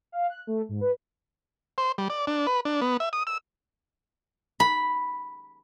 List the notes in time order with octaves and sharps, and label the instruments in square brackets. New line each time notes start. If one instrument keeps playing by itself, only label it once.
[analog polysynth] F5
F#6
A3
G#2
B4
[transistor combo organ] C5
G3
D5
D4
B4
D4
B3
E5
D#6
E6
[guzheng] B5